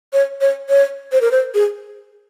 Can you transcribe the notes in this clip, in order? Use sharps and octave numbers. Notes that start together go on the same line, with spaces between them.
C#5
C#5
C#5
C5
A#4
C5
G#4